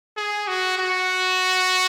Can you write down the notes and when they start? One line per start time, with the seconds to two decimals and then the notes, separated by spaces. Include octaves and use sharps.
0.17 G#4
0.47 F#4
0.78 F#4